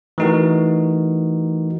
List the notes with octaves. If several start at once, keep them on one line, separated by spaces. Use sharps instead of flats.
E3 A3 D#4 F#4 A#4